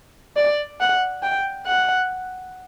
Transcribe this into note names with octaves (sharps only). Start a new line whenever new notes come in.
D5
F#5
G5
F#5